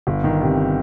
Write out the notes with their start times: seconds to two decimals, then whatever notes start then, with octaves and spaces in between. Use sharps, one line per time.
0.07 G1
0.24 D#3
0.42 C3